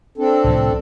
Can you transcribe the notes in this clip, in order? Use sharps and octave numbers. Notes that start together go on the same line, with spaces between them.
C4 D4 A4
C2 A2 F3